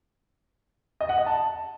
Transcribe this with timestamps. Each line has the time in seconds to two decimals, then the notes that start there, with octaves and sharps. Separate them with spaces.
1.01 D#5
1.09 F#5
1.18 D#5
1.26 A5